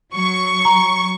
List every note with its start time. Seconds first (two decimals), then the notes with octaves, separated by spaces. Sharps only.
0.13 F#3 C#6
0.65 A#5